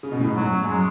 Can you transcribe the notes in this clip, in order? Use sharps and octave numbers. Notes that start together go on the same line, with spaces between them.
C#3
B2
A2
G#2
F#2 F#3
F#2
G#3